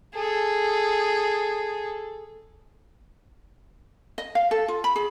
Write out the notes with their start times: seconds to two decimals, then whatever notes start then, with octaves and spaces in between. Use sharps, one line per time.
0.14 G#4 A4
4.18 D#5
4.35 F5
4.51 A4
4.68 F4
4.84 B5
4.96 G#4